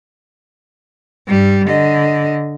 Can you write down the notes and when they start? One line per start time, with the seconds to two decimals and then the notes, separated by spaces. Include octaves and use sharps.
1.28 G2 G3
1.66 D3 D#5